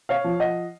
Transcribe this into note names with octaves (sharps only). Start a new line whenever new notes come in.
C#5 F5
F3
D#5 F#5